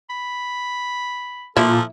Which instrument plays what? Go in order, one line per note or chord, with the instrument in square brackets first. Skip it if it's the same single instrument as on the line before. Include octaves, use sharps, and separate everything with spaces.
[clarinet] B5
[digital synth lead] A#2 [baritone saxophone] F3 [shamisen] E4 [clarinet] A4